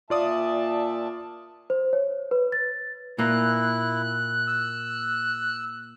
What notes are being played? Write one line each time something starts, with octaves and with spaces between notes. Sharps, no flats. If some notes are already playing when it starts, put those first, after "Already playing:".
A#2 F4 D5 E5 A5 D#6
C5
C#5
B4
A6
A#2 A#3 E4 F#6
E6